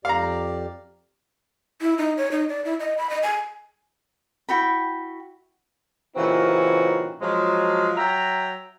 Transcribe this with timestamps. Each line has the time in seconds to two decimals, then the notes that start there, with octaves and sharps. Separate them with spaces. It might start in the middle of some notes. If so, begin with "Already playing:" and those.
0.05 F2 G4 D5 F5 A#5
1.81 E4
1.98 D#4
2.17 C#5
2.31 D#4
2.49 D5
2.65 E4
2.80 D#5
2.98 B5
3.10 D#5
3.23 G#5
4.49 E4 F#4 G5 B5
6.16 A#2 C#3 E3 C4 D#4 F#4
7.22 F3 F#3 G#3
7.97 F#3 E5 G5 A#5